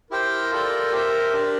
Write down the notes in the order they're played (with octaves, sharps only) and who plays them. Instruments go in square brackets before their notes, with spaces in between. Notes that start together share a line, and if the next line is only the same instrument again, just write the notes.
[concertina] E4 G4 C5 G5 [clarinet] A#4
[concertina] F4 A4 D5 G5
G4 C5 E5 G5
D4 G4 D5